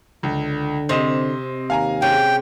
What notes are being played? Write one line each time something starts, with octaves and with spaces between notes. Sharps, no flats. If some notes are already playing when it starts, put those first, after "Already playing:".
C#2 D3
C3 C4 D#5 E7
D#2 F5 G#5 A#5
C3 G#3 C#4 G5